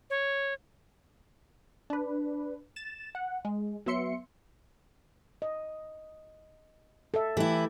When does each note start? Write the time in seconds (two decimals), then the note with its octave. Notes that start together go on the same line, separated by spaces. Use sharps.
0.10 C#5
1.90 D4 B4
2.76 A6 E7
3.15 F#5
3.45 G#3
3.86 F#3 B3 E5 C6 C#7
5.42 D#5
7.14 A4 E5
7.37 E3 A3 E4 G4 A4